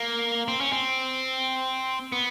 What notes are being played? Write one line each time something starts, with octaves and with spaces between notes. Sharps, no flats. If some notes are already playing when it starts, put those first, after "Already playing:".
Already playing: A#3
C4
C#4
C4
B3